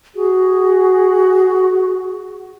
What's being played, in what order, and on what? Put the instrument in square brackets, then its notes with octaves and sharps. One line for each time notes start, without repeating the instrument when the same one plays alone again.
[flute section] F#4 G#4